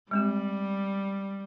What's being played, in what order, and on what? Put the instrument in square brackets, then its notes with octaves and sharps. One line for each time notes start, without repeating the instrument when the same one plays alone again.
[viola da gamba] G3 [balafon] G#3 C4 G4